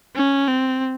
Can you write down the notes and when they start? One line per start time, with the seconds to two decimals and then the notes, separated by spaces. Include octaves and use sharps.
0.15 C#4
0.48 C4